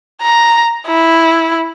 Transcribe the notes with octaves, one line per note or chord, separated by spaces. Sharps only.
A#5
E4